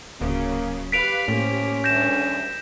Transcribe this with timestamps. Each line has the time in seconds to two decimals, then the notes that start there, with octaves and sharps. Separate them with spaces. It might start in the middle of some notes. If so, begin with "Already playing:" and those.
0.21 D1 C#3 F#3 A#3
0.92 G4 B4 F5 B6 D7 F7
1.28 A2 F3 A#3 C#4 G4
1.84 D2 D#3 G3 G6 A#6 E7